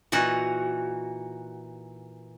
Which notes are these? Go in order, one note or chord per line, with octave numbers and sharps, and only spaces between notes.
A#2 E3 D#4 F#4